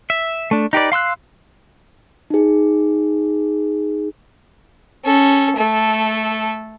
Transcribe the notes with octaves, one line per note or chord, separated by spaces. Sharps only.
E5
A3 D4
D#4 G4 B4 D5
F5 C6 E6 F#6
D#4 G#4
C#4 A4
A3 A4